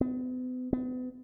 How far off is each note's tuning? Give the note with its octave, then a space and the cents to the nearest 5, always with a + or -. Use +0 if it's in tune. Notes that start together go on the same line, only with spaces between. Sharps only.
B3 +40
B3 +40